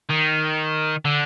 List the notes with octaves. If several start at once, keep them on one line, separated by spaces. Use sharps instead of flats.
D#3
D3